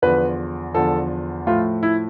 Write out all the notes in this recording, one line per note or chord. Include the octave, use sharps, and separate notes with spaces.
E2 D3 F3 B4
E2 D3 F3 A4
A2 F3 A3 F4
E4